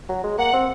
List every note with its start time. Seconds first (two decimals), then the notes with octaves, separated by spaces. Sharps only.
0.09 F#3
0.23 G#3
0.38 A#3 F#5
0.53 C4